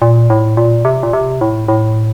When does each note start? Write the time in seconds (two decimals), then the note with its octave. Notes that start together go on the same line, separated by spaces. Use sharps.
0.02 A#2
0.30 A2
0.57 A#2
0.85 C3
1.03 A#2
1.13 C3
1.41 A2
1.68 A2